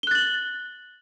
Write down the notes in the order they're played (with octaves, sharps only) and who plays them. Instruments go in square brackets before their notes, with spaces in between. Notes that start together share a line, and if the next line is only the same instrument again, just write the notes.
[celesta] G7
F#6
A6
F#7